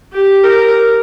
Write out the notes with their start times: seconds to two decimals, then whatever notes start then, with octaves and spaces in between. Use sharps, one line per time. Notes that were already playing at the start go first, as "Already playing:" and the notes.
0.13 G4
0.44 A#4